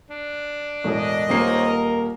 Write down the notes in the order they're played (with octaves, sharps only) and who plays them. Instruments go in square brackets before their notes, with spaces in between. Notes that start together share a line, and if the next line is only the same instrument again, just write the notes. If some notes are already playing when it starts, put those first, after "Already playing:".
[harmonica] D4
[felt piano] E1 A2 [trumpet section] D#5
[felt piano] D#1 A#3 C7 [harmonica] C4 D#4 C#5
[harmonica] A#4